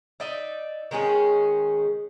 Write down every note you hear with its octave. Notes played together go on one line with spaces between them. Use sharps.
D#4 D5 E5
D#3 G#3 C#4 G#4